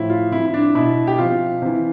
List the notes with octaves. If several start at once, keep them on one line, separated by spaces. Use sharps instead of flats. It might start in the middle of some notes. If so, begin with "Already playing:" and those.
Already playing: A2 F3 E4
F4
C3 F3 E4
E4
D4
B2 E4
G4
C3 F3 F4
C3 E3